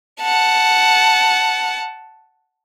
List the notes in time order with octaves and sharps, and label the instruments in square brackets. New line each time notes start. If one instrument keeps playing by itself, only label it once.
[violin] F#5 A5